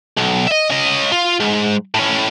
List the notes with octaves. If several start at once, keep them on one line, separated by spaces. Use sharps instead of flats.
B1
D#5 E5
C#4 D#5
F4
G#2
A2 C#4